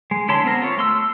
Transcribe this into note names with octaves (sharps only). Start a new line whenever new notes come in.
G#3
D3 E4 C#5 A5 C6
B3 C4 A#4
F4 C#5
A3 C6 E6